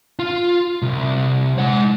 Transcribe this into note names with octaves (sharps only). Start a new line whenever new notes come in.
F4
C2
G#3 F#5